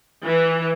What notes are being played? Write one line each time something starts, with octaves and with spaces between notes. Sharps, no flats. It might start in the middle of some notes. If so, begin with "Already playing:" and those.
E3